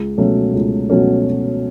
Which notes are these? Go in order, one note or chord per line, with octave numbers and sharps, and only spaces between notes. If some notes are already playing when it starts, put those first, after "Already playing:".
Already playing: C#2
B2 F#3 A3 C#4
C#2
B2 F#3 A3 C#4